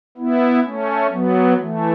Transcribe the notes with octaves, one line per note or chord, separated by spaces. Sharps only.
B3 E4
A3 C#4
F#3 B3
E3 A3